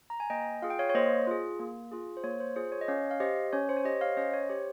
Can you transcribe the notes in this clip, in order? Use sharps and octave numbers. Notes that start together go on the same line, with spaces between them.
A#5
G#5
A#3 D#5 G5
F4 G#4 F5
G5
C#5 F5
C#5
A#3 C5 D#5
F4 G#4
A#3
F4 G#4
C5
A#3 C#5
C5
F4 G#4 C5
C#5
D#5
C#4 C#5 F5
F5
G4 C5 D#5
C#4 C#5
C5
C#5
G4 C5 D#5
C#5 F5
C#4 C5 D#5
C#5
G4 C5